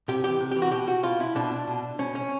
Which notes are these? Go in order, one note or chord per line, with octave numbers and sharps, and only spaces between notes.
C3 G4
E3 G4
C3
G4
E3
F#4
B2 G4
F#4
B2 F4
E4
B2 D4
B2
B2 C#4
C#4